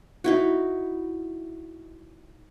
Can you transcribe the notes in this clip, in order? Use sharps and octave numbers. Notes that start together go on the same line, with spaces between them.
D#4 E4 F#4